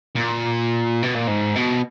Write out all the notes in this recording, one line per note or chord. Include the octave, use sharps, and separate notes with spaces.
A#2
B2
A#2
G#2
B2